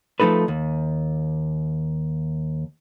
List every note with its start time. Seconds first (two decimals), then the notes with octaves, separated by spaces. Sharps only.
0.20 F3 A3 D#4 A4 B4
0.48 D#2